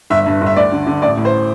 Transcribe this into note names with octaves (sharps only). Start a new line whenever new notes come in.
G1 E5
G2
G1
E5
D2 D5
D3
D3
A1 D5
A2
C5